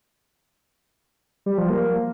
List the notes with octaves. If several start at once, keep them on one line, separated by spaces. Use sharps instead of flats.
G3
F3
A#3